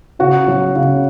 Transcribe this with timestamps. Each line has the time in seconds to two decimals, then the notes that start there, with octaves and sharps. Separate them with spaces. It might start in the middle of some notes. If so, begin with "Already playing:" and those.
0.19 C#3 F#4
0.48 F#3
0.76 C#3